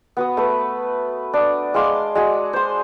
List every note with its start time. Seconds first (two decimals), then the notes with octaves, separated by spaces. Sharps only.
0.17 B3 F#4 D#6
0.37 A3 B4
1.33 D4 D#6
1.74 G#3 F5 C6 D6
2.15 G#3 F#4 G#4
2.53 C5 C6